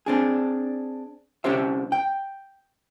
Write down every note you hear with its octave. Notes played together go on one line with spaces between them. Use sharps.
C4 D4 G#4
C2 C#4 G4 C5 E5
G5